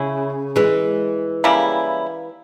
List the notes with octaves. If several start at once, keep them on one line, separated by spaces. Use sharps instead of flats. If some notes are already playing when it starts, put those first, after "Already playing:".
Already playing: C#3 C#4 E4
E3 G#3
C#3 G3 A#3 E4